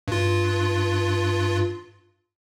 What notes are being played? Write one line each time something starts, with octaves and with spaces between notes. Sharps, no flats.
G2 F4